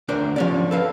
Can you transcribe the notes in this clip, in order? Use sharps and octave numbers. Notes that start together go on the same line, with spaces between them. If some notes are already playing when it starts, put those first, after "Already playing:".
D2 D4 A#4 C5 D5
F3 C#4 D5
A4 B4 F5